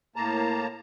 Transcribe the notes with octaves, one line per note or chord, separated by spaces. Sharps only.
A2 A#3 A5 A#5